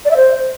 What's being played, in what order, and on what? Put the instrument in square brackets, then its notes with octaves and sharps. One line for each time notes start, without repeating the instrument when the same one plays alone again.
[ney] D5
E5
C5